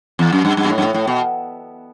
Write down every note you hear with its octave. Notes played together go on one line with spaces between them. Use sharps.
E2
F#2
G2
G2
B2
A2
G2
A2
A2
B2